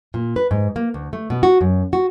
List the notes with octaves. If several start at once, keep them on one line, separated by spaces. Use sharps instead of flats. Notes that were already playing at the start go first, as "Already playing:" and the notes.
A#2
B4
G#2
A#3
D2
A3
B2
F#4
F#2
F#4